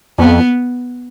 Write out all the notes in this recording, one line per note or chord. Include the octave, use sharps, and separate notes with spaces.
F2 B3